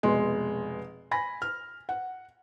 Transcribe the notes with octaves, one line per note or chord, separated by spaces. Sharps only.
F1 B2 G#3 C6
G#5 B5 A#6
F6
F#5